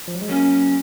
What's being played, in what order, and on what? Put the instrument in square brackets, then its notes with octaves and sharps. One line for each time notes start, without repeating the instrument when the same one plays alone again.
[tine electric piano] F3
F#3
G#3
[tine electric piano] F#3 A#3 [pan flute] C#4